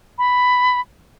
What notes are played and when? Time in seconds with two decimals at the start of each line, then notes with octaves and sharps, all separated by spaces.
0.18 B5